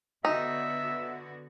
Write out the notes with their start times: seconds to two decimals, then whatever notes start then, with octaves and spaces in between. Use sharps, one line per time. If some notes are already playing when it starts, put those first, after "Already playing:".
0.25 D3 B3 D#4 F#4 E5